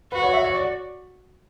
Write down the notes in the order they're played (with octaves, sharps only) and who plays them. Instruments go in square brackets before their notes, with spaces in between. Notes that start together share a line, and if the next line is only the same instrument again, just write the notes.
[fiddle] F#4 [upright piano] B4
[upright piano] C#5
E5
C#5
D5